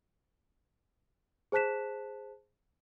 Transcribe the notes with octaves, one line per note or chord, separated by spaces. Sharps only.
G#4 C5 A5 F#6 B6 E7